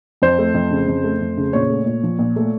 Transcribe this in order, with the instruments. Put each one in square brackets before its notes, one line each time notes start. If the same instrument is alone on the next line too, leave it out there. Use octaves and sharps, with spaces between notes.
[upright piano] F2 C5
A3
F2
C#3
F2
A3
F2
C#3
A#2 C#5
A3
A#2
F3
A#2
A3